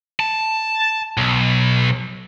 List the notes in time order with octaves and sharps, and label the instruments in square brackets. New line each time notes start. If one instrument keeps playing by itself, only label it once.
[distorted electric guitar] A5
B1